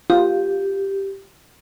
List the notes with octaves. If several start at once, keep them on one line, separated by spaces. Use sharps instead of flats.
F4 G4